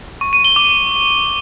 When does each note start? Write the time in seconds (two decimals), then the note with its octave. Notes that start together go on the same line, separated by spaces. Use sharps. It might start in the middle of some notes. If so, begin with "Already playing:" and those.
0.21 C#6
0.33 D#7
0.45 G7
0.56 D6